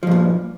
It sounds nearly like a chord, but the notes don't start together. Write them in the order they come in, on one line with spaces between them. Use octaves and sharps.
F3 G2 A#2